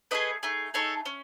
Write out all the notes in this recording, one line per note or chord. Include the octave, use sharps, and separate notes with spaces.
A3 D#4 G#4 B4 D#5
A3 D#4 G#4
A3 D#4 G#4 A4 C#5
C#4